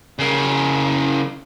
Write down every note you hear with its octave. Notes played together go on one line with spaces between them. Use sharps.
C#3 A#4